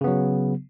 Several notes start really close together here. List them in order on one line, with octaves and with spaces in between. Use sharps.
C#3 B3 F#3